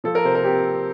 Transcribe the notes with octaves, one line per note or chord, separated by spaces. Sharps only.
F3 A4
A#4
C3 C5
A#4
C4 G4